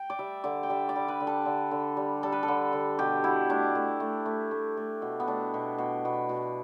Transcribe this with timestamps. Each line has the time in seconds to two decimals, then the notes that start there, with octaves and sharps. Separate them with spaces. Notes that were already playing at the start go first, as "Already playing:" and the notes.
Already playing: G5
0.10 D5
0.19 G3 E5
0.44 D3 D5
0.63 G5
0.69 G3 E5
0.89 D5
0.96 G3
1.08 B4
1.20 D3
1.27 A4
1.45 D3
1.71 D3
1.97 G3
2.23 G3 A4
2.32 B4
2.43 A4
2.48 D3
2.73 D3
2.99 B2 G4
3.24 B2 E4
3.49 A3 D4
3.75 A3
4.00 A3
4.25 A3
4.51 A3
4.77 A3
5.02 B2
5.20 B3
5.27 A3 D4
5.54 B2
5.78 B2
6.05 B2
6.29 B2